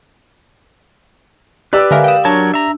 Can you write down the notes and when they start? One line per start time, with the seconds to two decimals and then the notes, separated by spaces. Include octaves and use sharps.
1.73 G4 B4 D5 E6
1.91 D3 G#3 A#4 E5 F5 G#5
2.04 F5 G5 D#6 E7
2.25 F#3 D4 A#4 C#5 A5
2.54 E5 A#5